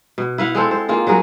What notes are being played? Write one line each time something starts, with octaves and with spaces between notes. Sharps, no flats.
B2
E4 B4 F5 F#5
G#3 C4 A4 C5
C5
A#3 D#4 F4 G#4
F#3 F#4 G#4 A#4